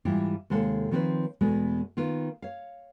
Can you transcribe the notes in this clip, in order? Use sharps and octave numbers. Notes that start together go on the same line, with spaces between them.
G#2 E3 G3 E4 F4 G4
D#2 C3 G#3 A4 F5 F#5
D#3 F3 C4 A#4 B4 C#5
E2 B2 G#3 A3
D#3 B3 F4
C#5 F5